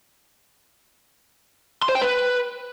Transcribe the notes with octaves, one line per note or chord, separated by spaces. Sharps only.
C6
C5
G5
B4